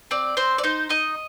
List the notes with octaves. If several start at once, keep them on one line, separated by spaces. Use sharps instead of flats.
C4 D5
C4 C5
D5
D#4 C5
D#4 D#5